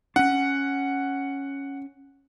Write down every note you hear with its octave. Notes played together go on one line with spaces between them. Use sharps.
C#4 D4 F#5